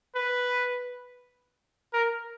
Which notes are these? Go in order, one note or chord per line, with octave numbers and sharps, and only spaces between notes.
B4
A#4